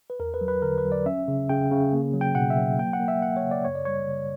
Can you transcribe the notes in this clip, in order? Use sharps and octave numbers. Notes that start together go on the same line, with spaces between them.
B4
E2 A#4
B4
F#3
B4
D3 A#4
B4
F#3
D5
C#4 E5
C#3
C#3 G5
C#3
A#3
F#3
G5
B2 F#5
E5
F#3
A#3 G5
F#5
A#3
E5
A#3 F#5
C#5
C#3
D5
F#2 C#5
D5
G3 C#5
C#3